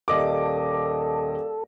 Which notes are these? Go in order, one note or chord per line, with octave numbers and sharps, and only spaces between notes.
D#1 A4 A#4 D5 D#5 F5 D6